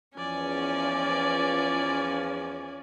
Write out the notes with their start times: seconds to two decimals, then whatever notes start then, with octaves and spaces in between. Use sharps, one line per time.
0.17 E2 F3 C#4 D5 G#5